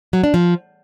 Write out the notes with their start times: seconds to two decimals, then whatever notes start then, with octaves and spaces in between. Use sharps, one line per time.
0.13 F#3
0.24 D4
0.34 F3